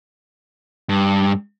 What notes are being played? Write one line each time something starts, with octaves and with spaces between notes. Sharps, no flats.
G2